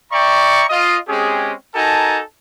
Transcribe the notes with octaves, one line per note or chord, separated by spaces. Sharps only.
D5 E5 G5 A#5 C#6
F4 D#5
G#3 C4 C#4 G4 G#4
D#4 F#4 A4 A#4 G#5 A5